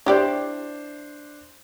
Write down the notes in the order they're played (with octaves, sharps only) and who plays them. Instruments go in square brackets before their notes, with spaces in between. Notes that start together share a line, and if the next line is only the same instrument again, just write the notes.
[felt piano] D4 C5 [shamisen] E4 G4 D5